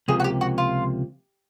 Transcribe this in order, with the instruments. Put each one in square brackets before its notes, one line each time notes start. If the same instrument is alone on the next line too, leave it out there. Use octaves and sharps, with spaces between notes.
[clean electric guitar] C#2 C3 F3 A#3 [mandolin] G#4
[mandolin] F#4
G4
F#4
F4